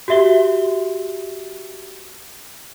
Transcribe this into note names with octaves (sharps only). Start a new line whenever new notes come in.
F#4 G4 E5 G7